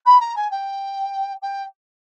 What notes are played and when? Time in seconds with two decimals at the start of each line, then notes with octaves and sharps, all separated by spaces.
0.06 B5
0.20 A#5
0.36 G#5
0.51 G5
1.42 G5